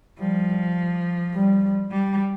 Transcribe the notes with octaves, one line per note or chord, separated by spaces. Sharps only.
F3 G3
G3
G3